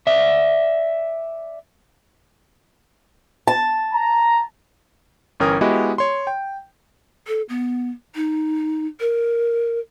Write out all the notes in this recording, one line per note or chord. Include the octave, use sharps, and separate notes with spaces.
D5 E5
A5
A#5
G1 E3 C#4 A#4 G5 D#6
G#3 B3 E4 F#4 G4 D#5
C#5 C6
G5
A4
B3
D#4
A#4